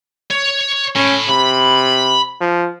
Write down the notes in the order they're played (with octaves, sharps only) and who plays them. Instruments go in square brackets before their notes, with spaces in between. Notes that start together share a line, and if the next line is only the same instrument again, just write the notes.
[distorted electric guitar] C#5
[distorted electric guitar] A2 [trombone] C#4
[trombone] C3 [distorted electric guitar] B5
[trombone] F3